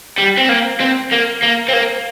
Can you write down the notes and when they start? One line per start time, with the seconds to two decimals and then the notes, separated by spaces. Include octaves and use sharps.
0.18 G3
0.37 C4
0.49 A#3
0.80 C4
1.12 A#3
1.42 A#3
1.68 C4
1.73 A#3